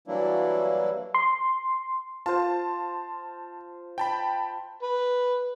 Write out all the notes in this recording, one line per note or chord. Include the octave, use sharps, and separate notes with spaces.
E3 F#3 G3 A#3 D4 E4
C6
F4 C5 A5
G5 A5 B5
B4